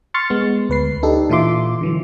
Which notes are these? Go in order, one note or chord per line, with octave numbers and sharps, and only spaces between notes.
C6 C#6 F6 A6 C#7
G#3 B3
D2 B4 C7
D4 D#4 G4 A4
A#2 E3 F4 E5 C6 D6
D3 E3 F#3